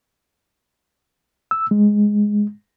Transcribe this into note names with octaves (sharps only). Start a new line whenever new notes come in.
E6
G#3